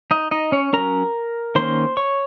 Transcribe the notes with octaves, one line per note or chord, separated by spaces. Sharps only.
D#4 D#5
D#4 D#5
C#4 C#5
F#3 C#4 A#4 A#5
D#3 A#3 C#4 C5 C6
C#5 C#6